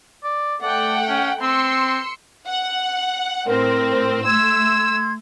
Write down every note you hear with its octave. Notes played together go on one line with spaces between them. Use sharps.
D5
A3 D5 F#5 G5
C#4
C4 C6 E6 C#7
F#5
A2 C4 A#4
A3 C6 E6 G#6